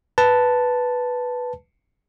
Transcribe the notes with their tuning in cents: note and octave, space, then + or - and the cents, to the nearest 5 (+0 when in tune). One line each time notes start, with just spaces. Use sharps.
B4 +0 A5 +0